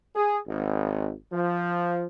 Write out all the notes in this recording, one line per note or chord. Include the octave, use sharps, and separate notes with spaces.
G#4
G#1
F3